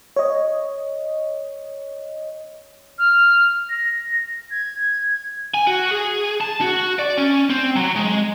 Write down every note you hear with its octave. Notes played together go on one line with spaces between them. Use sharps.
C#5 D#5
F6
A#6
G#6
G#5
F#4
G#4
A5
F#4
D5
C#4
C4
F#3
G#3